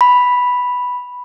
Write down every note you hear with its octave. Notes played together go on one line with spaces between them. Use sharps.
B5